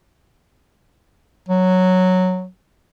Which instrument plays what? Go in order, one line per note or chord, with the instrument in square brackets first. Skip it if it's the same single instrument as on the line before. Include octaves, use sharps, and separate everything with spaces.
[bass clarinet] F#3